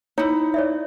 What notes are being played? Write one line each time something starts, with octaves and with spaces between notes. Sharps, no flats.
D#4 E4 C#5
C#5 D5 E5